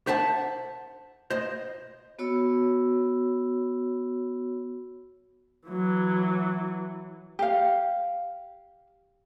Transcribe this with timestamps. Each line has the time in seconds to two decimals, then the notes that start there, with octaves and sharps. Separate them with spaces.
0.07 C5 E5 F#5 A5
1.30 C5 D#5
2.19 B3 F#4 C#5 B5 E6
5.68 E3 F#3
7.39 G4 F5